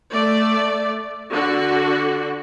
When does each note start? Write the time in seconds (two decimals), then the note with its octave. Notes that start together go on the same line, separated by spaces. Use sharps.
0.12 A3 D5
1.31 D3 F#4